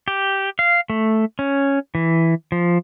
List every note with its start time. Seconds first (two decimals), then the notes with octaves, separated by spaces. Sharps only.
0.08 G4
0.59 F5
0.90 A3
1.39 C#4
1.95 E3
2.52 F3